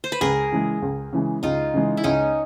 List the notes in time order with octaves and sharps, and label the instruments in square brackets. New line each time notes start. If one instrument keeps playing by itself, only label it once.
[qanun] C5
B4
[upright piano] C#2 [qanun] G#4 A#4
[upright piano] C#3 E3 G#3
C#2
C#3 E3 G#3
[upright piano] C#2 [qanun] D#4 F4
[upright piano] C#3 E3 G#3
[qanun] E4
[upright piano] C#2 [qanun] C#4 D#4